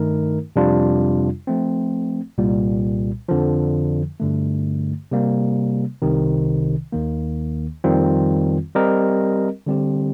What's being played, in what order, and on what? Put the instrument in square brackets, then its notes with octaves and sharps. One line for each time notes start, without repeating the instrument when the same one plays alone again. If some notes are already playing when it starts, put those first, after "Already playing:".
Already playing: [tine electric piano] G2 D#3 A3 D#4 A#4
F2 C3 G3 D4 F4
F3 A3 C4
C2 A#2 G3
F2 D3 F3
G2 D3 A3
C3 G3 A#3
C2 C3 D#3
D#2 D#3 A#3
F2 D#3 G3 C4 F4
G3 C4 G4 A#4 D#5
D3 G3 C4 G4